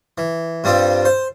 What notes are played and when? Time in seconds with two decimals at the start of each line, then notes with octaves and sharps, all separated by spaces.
0.18 E3
0.64 G2 G3 C4 D4 F4
1.05 C5